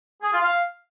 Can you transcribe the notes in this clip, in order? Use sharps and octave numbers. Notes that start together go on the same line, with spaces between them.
G#4
F4
F5